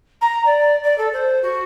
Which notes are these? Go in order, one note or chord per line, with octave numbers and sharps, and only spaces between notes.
A#5
D5
D5
A4
C5
F#4